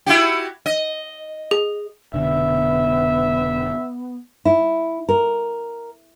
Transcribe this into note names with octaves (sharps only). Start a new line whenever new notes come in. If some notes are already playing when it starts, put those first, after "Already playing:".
E4 F#4 G4
D#5
G#4
F1 B2 D3 B3 E5
E4
A#4